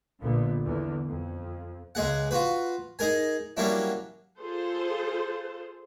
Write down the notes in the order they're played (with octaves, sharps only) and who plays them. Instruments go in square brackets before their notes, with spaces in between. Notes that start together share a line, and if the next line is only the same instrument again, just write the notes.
[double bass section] A#1 A#2 D3 B3
E2 D3
F2
[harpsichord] C#2 G#3 G#4 F#5
F4 F#4 B4
D#4 G#4 A#4 G#5
F#3 G3 A#3 C#4 D4 E4
[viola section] F4 G#4 A4 C5